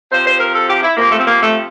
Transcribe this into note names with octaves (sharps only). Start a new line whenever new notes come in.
C3 F3 C5
C5
A#4
A4
G4
E4
C3 F3 A#3
A3
C4
A#3
A3